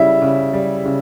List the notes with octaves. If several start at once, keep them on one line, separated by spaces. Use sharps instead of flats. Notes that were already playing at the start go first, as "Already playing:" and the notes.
Already playing: C#3 G3 E4 E5
C#3
G3
C#3